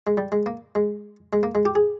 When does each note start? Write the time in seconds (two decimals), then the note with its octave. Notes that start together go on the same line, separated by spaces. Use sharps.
0.07 G#3
0.17 G3
0.32 G#3
0.46 A#3
0.75 G#3
1.33 G#3
1.43 A#3
1.55 G#3
1.65 G4
1.75 G#4